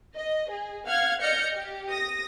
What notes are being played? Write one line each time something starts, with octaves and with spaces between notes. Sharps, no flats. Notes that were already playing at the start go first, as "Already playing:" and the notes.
D#5
G#4
F5 F#5 F6 G#6
D5 D#5 F6 G6 A#6 C#7
G4
D#6 A#6